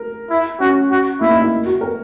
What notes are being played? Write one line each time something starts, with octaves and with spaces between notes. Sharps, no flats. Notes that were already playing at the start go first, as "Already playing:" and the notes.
Already playing: A#4
E4
C#4 F#4
F#4
A#3 E4
D#4
E4
F#4
A#4